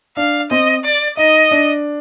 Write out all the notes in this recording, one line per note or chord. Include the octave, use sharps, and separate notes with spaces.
D4 F5
C4 D#5
D5
D#4 D#5
D4